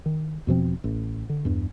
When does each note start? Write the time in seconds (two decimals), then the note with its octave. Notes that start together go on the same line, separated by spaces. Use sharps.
0.06 D#3
0.47 E2 B2 F3 C4
0.84 A1
1.29 D3
1.45 E2 G2